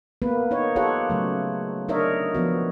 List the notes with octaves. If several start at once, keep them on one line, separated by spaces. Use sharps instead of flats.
A#3 B3 B4
D#4 C#5
F4 G4 A4 C#5 F#5
C#3 F#3 A3
D4 D#4 A#4 C#5 D#5 E5
F3 B3 F#4